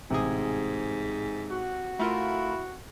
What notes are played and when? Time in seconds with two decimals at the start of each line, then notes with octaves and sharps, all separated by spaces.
0.10 A1 G#2 C3 G#4
1.51 F#4
1.99 A3 E4 F4 A#4